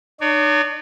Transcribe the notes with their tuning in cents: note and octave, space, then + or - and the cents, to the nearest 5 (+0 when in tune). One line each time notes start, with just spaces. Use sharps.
D#4 -45 C#5 +40